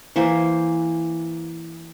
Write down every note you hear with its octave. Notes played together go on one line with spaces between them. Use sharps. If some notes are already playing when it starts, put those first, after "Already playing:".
E3 A#3 C5